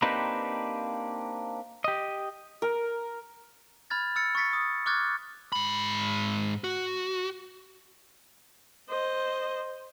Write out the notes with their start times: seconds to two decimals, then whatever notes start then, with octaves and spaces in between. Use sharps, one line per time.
0.02 A#3 C4 D4 D#4 G4 B4
1.84 G4 D#5
2.62 A#4
3.90 B5 F6 G#6 A6
4.16 E6 F6 A6 C#7
4.35 C#6 F6 A6 B6 C#7
4.53 D#6
4.86 C#6 D6 F6 F#6 G#6 A6
5.52 G#2 B5
6.64 F#4
8.89 C5 D#5